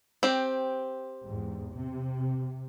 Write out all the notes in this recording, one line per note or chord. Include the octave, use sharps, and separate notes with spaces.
C4 G4
E2 G#2
C3